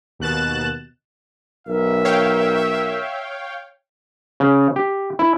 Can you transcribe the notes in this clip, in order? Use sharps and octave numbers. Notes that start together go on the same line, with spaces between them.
D#2 B2 F#6 A6 E7
B1 A#4 E5
C#5 F5 G5
C#3
G4
E4